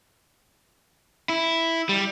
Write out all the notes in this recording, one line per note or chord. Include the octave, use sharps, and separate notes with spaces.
E4
G3